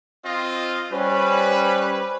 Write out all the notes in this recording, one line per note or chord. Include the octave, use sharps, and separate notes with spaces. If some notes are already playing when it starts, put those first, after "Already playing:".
C4 F4 D#5
G3 C#4 B4 C5